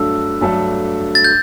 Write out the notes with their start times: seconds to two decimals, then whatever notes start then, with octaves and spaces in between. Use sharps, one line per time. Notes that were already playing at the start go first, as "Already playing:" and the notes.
Already playing: G2 F#3 A3 D4 A4 E6
0.41 G2 F#3 A3 D4 A4
1.15 A6
1.24 G6